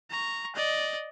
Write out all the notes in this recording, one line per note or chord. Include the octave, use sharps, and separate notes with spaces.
A#5 C#6
D5 D#5